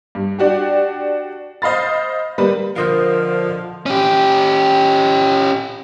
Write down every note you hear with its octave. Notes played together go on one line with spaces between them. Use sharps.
G2
D4 F#4 G4
C5 D#5 F5 B5 A6
G3 A#3 B4
D3 F3 A#4 C5 D#5 F5
C#4 G4